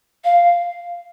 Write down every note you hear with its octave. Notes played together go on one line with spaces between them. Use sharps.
F5